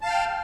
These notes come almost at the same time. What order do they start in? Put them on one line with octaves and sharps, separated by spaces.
A5 F5 F6 G5